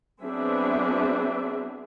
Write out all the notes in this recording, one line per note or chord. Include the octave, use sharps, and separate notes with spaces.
F#3 B3 C4 D4 G#4 E5